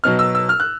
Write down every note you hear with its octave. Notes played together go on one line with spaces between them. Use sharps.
B2 F#3 B3 D#4 F6
E6
E6
F6
F#6